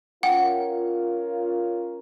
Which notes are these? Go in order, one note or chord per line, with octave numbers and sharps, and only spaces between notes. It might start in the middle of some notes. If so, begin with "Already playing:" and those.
C#4 F4 A#4 F#5 G5